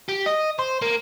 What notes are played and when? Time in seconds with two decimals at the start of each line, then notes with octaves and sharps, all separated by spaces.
0.09 G4
0.26 D#5
0.59 C5
0.82 A#3